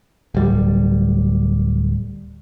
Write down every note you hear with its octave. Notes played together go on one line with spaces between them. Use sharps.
D1 G3